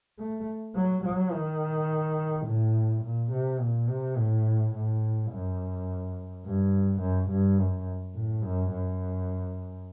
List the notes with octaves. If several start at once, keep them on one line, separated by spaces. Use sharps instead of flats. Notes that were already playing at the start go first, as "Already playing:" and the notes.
A3
F#3
F#3
D#3
A2
A#2
C3
A#2
C3
A2
A2
F#2
G2
F#2
G2
F#2
A2
F#2
F#2